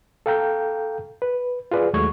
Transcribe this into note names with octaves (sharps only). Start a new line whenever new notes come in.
A4 F5 G5 A#5 G6
B4
F4 G#4 B4 D5
D#2 F#3 G#3 A3 C#6 G#6